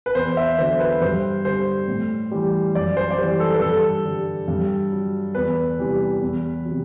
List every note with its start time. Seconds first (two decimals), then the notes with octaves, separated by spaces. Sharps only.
0.06 B4
0.15 E2 C5
0.37 E5
0.58 D3 F#3 C5
0.80 B4
1.01 G2 C5
1.45 D3 G3 C5
1.88 A2
2.31 E3 G3
2.75 F#2 D5
2.97 C5
3.11 D5
3.18 E3 G3 C5
3.40 A4
3.54 B4
3.61 G2 A4
4.05 D3 G3
4.48 G2
4.92 F#3
5.35 E2 B4
5.78 C3 E3 G3
6.22 E2
6.65 C3 F#3